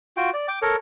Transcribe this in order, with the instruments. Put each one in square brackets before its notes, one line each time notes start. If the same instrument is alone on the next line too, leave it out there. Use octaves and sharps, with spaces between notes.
[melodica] F4 F#4 G5
D5
G5 D6
A4 A#4 C#5